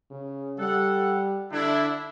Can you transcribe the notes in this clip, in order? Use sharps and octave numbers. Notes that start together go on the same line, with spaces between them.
C#3
G3 A4 F#5
D3 D4 E4